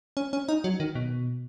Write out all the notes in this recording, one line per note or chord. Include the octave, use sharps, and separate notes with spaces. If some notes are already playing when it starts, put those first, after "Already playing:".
C#4
C#4
D#4
F#3
D#3
B2